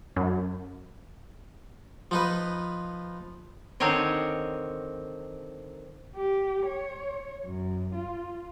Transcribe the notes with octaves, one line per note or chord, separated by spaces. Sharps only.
F#2
F3 D#4 B4
D3 D#3 C4 A#4 C#5 D#5
G4
C#5
F#2
F4